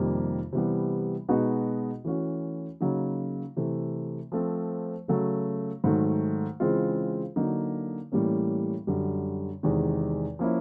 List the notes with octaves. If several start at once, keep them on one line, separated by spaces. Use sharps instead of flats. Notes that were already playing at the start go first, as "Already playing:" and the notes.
Already playing: F2 C3 D#3 G3 A#3
C3 E3 G3 B3
B2 G#3 B3 D#4 F#4
E3 A3 C#4 F#4
C#3 F#3 A#3 D#4
C3 E3 A3
F3 A3 C4
C#3 F#3 A3
G#2 D#3 F#3 A3
C#3 E3 G#3 C4 F4
D3 F#3 A#3 D#4
A2 E3 G3 A#3 C#4
F#2 D3 G3
E2 C3 D#3 G#3
F3 A#3 C#4 E4